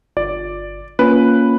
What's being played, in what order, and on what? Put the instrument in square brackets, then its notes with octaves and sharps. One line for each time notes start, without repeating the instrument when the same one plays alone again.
[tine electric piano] G1 [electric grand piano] D5
[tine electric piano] A#3 C#4 F4 [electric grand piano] B4